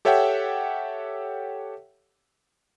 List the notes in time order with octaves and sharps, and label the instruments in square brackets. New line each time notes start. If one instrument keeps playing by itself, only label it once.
[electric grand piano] G4 A4 C#5 E5 F#5 G5